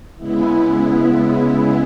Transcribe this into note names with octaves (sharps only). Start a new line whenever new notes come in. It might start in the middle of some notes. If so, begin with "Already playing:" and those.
C#3 G#3 B3 E4